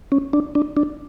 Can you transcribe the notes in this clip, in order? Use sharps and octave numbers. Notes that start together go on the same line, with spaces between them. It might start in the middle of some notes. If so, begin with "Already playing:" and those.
C#4
D4
D4
D4